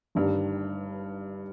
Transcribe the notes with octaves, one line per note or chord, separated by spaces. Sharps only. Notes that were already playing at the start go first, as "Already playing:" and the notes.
G1 G2 D#3 G3